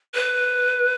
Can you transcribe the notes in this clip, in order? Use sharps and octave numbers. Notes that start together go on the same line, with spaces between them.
B4